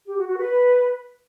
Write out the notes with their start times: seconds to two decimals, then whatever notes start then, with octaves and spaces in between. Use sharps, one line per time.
0.06 G4
0.16 F#4
0.27 F#4
0.38 B4